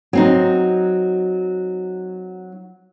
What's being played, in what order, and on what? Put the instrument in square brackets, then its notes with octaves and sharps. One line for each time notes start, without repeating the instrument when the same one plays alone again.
[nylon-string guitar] F#3 C4 D#4